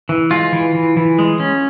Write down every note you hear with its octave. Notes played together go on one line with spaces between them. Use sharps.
E3
G#3 F4
E3
E3
E3
G#3
C#4